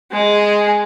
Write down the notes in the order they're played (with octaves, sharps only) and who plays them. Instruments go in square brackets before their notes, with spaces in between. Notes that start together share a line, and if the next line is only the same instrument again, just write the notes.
[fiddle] G#3 G#4